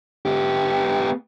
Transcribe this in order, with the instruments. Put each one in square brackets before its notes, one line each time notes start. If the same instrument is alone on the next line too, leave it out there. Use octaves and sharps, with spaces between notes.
[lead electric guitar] B3 G4